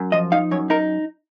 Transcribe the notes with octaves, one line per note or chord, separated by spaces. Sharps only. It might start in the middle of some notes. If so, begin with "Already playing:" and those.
Already playing: F#2
F3 D#5
D#4 F5
F#2 C#5
D#4 A#4